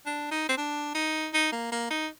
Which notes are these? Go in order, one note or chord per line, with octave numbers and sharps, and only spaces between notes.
D4
D#4
C4
D4
D#4
D#4
A#3
A#3
D#4